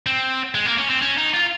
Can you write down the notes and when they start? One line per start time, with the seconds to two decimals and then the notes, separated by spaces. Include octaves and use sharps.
0.06 C4
0.55 G#3
0.66 A#3
0.78 C#4
0.90 C4
1.02 C#4
1.18 D#4
1.34 F4